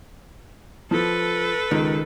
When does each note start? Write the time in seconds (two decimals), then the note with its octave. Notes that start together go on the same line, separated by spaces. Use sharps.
0.91 F3 A4 B4
1.71 C#2 D#3